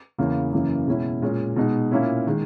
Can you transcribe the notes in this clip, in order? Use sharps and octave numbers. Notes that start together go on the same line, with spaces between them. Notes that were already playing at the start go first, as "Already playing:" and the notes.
E2 C#3 E3 A#3
F#2 C#3 E3 A#3
B2 G#3 C#4 E4
A#2 G#3 C#4
B2 G#3 D#4
A#2 A#3 C#4 E4
D#3 G#3